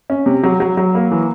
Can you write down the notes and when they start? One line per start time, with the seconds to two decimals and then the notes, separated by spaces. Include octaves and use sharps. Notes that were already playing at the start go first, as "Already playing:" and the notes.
0.10 C#4
0.26 C3
0.43 F#3
0.60 F#3
0.77 F#3
0.95 A#3
1.11 E3